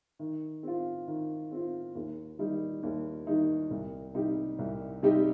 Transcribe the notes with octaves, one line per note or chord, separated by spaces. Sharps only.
D#3
C4 F4
D#3
C4 F4
D#2
D#3 G3 D#4
D#2
D#3 G3 D#4
C2
C3 G3 D#4 G4
C2
C3 G3 D#4 G4